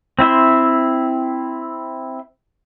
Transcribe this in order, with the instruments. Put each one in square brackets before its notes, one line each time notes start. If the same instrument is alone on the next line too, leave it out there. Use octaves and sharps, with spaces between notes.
[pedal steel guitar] C4 E4 E5 C6